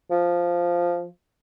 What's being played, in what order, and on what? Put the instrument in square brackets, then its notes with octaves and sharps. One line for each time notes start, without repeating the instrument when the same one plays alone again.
[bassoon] F3